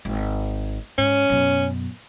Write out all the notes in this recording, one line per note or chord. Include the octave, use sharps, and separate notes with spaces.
G#1
G#2 C#4
F#2 B2